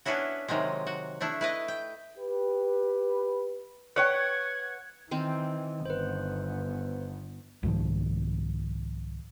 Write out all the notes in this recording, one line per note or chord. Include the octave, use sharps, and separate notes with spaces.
B3 C#4 D4 E4 F#4
C3 D#3 F#3 G#3
F#4
A3 D4 E4
E4 B4 D#5
G5
G4 B4
B4 C#5 F#5 G5
G#6
D#3 E3 C4
G1 B3 B4 C5
C2 G#2 D#3 F3